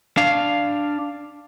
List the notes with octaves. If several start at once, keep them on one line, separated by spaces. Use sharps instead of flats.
D4 F5